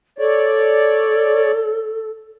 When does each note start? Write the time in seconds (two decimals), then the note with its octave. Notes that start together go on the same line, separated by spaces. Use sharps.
0.18 A4 C#5 D5